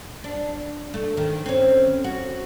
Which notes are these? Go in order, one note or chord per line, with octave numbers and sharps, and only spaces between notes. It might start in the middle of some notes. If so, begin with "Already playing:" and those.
D4
A3
D#3
C4 C#4
F#4